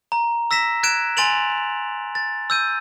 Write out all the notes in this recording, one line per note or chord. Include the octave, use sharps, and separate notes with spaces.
A#5
E6 A#6 B6 E7
F#6 G#6 D7 E7
G#5 C6 A6 D7 F7 F#7
A6
E6 G6 D#7